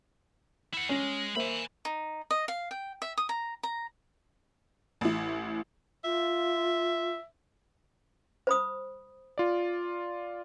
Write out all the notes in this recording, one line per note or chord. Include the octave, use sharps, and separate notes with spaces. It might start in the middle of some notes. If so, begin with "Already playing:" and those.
E4 F#5
G#3 C#4 C#5
A#3 C5 E5 G#5 B5
D#4
D#5
F5
G5
E5
D#6
A#5
A#5
A1 E4
F4 E5
C5 B5 D#6
F4 D5